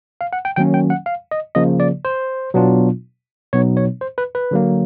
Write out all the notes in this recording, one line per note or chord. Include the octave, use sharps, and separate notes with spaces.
F5
F#5
G5
D#3 F#3 A#3 C#4 G5
G5
F#5
F5
D#5
C#3 F3 A#3 D#5
D5
C5
B2 F#3 B3 D4 F4
B2 F#3 B3 D#4 C#5
C#5
C5
B4
B4
D3 F#3 A#3